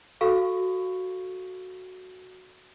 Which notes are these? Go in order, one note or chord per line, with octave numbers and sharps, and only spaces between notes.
F#4 A4 F5 C#6